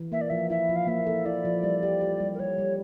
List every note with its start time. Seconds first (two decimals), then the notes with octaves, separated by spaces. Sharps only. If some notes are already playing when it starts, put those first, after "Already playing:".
Already playing: E3
0.12 A#3 E5
0.21 D5
0.30 F3 E5
0.50 E4 E5
0.69 F3
0.76 F5
0.87 A#3 E5
1.07 A4
1.26 E4 D5
1.45 F3
1.64 G3
1.83 G4
2.01 G4
2.20 G3
2.34 A#4
2.39 G3 C#5
2.58 G3